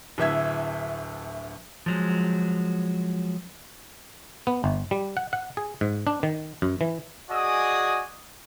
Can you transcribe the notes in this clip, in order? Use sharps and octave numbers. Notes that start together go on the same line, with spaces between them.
D1 D2 E5 G#6
F3 F#3 G#3
B3
G1
G3
F#5
F#5
G#4
G#2
D4
D#3
F#2
E3
F#4 G#4 D5 D#5 G#5 D#6